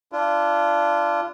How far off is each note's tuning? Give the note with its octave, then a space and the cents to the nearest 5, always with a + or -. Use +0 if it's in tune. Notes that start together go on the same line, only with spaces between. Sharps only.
D4 -5 F4 -30